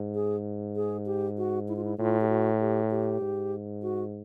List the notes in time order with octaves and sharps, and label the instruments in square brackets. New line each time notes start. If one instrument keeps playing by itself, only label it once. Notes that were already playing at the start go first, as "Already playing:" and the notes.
Already playing: [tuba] G#2
[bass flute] G#4
G#4
G4
F#4
E4
F4
E4
[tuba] A2 [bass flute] F4
[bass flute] G4
F#4
G4
G4
[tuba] G#2
[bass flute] F#4